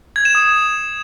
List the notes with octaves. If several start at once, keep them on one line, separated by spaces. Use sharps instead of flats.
G#6
E7
D#6